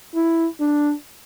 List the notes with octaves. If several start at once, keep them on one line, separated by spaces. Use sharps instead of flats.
E4
D4